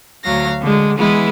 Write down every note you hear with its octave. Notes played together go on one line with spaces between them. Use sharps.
D2 F#3 F5 A#6
D3 G#3
E3 G#3 B3 E4